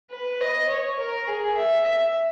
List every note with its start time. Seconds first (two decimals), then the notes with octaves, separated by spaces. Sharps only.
0.11 B4
0.41 D#5
0.69 C#5
0.98 A#4
1.27 G#4
1.56 E5
1.84 E5